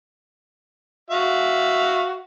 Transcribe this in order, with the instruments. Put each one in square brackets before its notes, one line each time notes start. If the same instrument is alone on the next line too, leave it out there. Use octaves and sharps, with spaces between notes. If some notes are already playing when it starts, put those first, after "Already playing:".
[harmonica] F#4 E5 F5